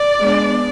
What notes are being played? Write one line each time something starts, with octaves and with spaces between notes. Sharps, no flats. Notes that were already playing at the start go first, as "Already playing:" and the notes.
Already playing: D5
G#3 B3 D4